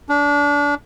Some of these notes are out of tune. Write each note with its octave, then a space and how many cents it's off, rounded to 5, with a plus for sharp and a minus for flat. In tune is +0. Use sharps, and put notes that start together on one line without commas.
D4 -25